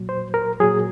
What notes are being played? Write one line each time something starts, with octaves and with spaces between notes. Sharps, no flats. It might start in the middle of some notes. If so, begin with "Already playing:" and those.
Already playing: A#2 F#3
C5
A#4
A#2 F#3 G#4